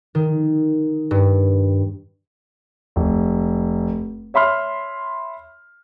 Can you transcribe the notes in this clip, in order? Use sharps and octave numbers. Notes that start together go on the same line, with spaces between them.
D#3
G2
F1
C#5 E5 B5 C6 F6